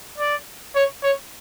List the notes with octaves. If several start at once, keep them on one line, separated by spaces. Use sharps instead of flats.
D5
C#5
C#5